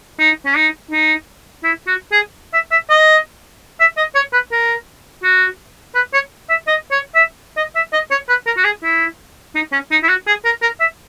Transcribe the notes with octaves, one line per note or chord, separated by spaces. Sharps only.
D#4
C#4
D#4
D#4
E4
F#4
G#4
E5
E5
D#5
E5
D#5
C#5
B4
A#4
F#4
B4
C#5
E5
D#5
C#5
E5
D#5
E5
D#5
C#5
B4
A#4
F#4
G#4
E4
D#4
C#4
D#4
E4
F#4
G#4
A#4
A#4
E5